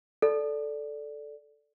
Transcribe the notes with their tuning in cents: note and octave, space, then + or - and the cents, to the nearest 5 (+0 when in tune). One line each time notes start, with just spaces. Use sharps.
A4 -5 D5 +0